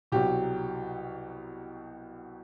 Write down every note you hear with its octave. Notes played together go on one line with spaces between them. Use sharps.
C2 B2 F#3 G4